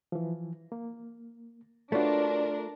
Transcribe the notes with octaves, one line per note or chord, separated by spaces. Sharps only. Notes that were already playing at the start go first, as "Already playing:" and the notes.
E3 F3
A#3
A3 D4 F4 F#4 A#4 B4 C#5 D5